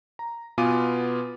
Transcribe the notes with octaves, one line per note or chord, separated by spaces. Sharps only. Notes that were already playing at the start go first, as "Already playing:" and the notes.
A#5
B2 B3 F4 G#5 D6 D#7